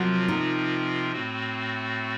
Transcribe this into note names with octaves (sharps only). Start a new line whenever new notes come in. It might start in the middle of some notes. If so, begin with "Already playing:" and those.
Already playing: C3 F3 F#3 C4 F4 A#4
D#4
A2 A3 C4 F#4